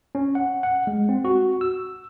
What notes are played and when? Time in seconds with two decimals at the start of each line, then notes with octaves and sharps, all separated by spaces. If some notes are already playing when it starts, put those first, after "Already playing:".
0.15 C#4
0.35 F#5
0.63 F#5
0.87 G#3
1.09 C4
1.25 F#4
1.61 E6